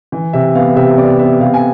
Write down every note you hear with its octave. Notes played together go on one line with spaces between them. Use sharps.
E3
C3 E5
B3 F5
C3 E5
B3 D5
B3 E5
C3 F5
G#5